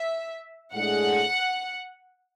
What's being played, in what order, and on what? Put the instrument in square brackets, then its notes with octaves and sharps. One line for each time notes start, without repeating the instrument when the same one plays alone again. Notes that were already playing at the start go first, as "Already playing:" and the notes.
Already playing: [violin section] E5
[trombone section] A2 G#3 D4 G#4 [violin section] F#5